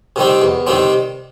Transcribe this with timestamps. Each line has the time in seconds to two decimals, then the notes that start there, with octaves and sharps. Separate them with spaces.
0.16 C3 D#3 G3 C4
0.42 E2
0.67 C3 D#3 G3 C4